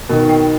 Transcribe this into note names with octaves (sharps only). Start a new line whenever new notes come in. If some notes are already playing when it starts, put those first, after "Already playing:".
B2 D#3 A#4
G5